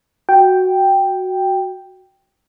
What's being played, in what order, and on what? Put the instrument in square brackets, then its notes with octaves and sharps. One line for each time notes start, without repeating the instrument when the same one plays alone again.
[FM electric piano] F#4 G5